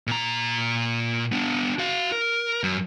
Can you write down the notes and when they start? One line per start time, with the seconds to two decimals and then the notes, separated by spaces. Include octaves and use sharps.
0.07 A#2 A#5
1.32 B3 D4
1.79 F#4 F5
2.12 A#4
2.63 F#2